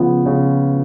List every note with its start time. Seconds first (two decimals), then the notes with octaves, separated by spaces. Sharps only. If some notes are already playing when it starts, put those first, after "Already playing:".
Already playing: C#3 F3 B3
0.26 C#3